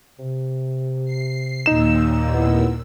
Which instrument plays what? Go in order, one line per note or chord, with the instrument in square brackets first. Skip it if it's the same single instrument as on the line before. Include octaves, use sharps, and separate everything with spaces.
[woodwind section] C3
[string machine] C7
[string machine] D#2 A#2 E6 [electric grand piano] D#4 E7
[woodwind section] B3 C4 E4